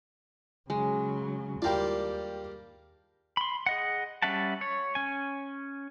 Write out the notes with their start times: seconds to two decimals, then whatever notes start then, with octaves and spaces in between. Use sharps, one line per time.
0.70 C#3 F#3 G#3
1.62 D#2 G3 A#3 D4 F4 G5
3.37 B5 C6
3.66 G#4 D#5 F#5
4.22 G3 C#4 E5 F#5 A5
4.61 C#5
4.95 C#4 G#5